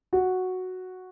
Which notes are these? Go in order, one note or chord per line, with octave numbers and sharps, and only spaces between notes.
F#4